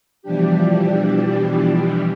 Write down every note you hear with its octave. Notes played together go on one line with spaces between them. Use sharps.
B2 E3 F3 G3 D4 G4